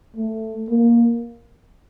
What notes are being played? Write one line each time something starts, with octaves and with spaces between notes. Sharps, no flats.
A3
A#3